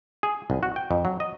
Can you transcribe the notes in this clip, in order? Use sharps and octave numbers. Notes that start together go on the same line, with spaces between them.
G#4
C2
F#4
G5
F2
F#3
D#5